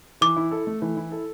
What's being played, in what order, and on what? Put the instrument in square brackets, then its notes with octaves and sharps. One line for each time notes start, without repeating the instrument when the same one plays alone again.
[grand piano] E3 [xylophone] D6
[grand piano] E4
A4
A3
E3
E4
A4